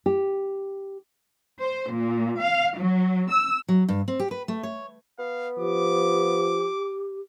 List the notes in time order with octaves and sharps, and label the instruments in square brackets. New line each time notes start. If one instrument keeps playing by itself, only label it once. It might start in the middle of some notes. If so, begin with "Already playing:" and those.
[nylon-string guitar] G4
[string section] C5
A#2
F5
F#3
E6
[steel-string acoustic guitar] F#3
G2
C4
G4
B4
A3
C#5
[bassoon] B3 [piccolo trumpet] F5
[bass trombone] F3 [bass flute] G4 [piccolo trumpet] D6